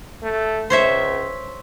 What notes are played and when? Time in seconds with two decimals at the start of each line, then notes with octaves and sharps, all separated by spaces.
0.23 A3
0.70 C#2 C5 C#5 E5